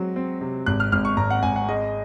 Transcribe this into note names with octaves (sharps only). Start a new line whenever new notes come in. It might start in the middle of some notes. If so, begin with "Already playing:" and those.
Already playing: F#3 G#3 C4
C4
C3
G#1 F#6
F6
G#1 F6
C#6
G#1 A#5
F#5
G#1 G#5
F#5
G#3 D#5